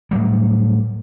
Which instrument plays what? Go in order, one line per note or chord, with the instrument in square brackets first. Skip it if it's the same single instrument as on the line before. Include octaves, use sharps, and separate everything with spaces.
[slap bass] A2 F#3 G3